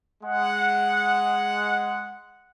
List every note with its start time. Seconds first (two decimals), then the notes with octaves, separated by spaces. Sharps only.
0.23 G#3 F#5